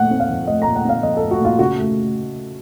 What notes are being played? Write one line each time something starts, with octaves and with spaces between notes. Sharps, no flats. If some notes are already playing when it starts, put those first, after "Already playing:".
Already playing: A#2 F3 A3 F#5
C4
F5
F3
A3 D#5
A#5
A#2
F#5
C4 F5
F3 D#5
A4
A3
F#4
A#2 F4
C#3 F#4
A3